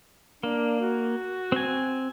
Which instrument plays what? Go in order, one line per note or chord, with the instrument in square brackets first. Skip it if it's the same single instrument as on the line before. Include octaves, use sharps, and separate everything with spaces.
[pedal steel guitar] A#3 [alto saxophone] D4
[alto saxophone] F#4
[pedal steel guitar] C4 G#5